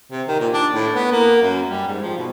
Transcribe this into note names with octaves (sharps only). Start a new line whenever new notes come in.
C3
D#3
A#2
D4
A2
B3
A#3
F#2
G3
G#2
F3
B2